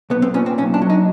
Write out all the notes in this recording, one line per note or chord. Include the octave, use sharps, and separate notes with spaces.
B1 B3
C4
A#2 C#4
C4
B1 C#4
D4
F#3
D#4